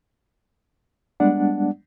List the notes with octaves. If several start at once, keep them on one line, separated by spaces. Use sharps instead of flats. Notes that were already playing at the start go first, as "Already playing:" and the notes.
G3 G#3 B3 D4 D5 F#5